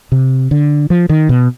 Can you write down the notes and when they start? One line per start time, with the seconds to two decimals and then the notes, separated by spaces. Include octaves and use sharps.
0.12 C3
0.51 D3
0.90 F3
1.09 D#3
1.29 B2